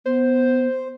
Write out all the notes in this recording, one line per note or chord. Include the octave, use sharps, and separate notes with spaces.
B3 C5